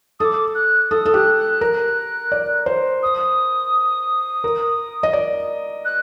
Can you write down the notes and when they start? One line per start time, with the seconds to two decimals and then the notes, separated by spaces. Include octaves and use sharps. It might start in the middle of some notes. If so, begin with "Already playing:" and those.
0.19 A4 D6 D#6
0.55 F#6
0.90 A4 D#6
1.06 A4
1.14 G4 F#6
1.38 F#6
1.61 A#4
2.32 D5
2.66 C5
3.02 D#6
4.44 A#4
5.03 D#5
5.13 D5
5.85 F#6